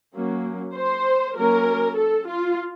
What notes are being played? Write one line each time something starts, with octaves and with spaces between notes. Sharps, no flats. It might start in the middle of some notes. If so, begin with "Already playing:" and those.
F#3 A#3 C#4
C5
F#3 A#3 C#4 A#4
A4
F4